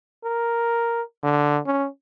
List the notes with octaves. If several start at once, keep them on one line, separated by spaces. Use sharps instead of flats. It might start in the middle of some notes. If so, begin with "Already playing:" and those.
A#4
D3
C#4